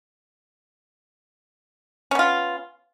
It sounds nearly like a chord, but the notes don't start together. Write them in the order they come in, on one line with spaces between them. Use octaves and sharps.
C#4 B3 F4